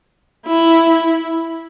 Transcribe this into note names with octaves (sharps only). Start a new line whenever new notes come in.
E4